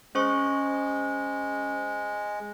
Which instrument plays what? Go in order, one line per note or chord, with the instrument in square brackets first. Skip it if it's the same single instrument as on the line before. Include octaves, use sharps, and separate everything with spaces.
[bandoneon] G#3 [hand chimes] C#4 C5 C#6